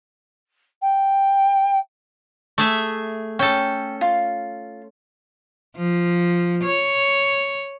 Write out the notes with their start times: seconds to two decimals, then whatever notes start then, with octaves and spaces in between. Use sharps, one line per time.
0.82 G5
2.58 A3 G#4 E5
3.39 C#4 A4 G5
4.01 F4
5.76 F3
6.63 C#5